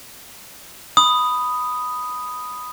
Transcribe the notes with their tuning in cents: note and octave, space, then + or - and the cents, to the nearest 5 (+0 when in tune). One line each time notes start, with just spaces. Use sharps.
B5 +5 D#6 +0